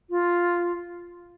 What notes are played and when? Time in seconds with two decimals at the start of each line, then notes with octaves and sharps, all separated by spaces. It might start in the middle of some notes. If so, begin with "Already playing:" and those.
0.10 F4